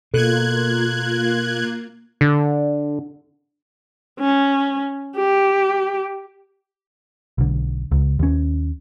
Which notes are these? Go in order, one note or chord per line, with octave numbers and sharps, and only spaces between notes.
B2 A#3 F4 A4 F#6 G#6
D3
C#4
G4
B1 D3
C#2
D#2 C#4